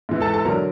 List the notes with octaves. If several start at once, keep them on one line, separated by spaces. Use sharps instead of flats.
G#2 E3
A4 A5
A4 A5
D3 F#3 A#4 A#5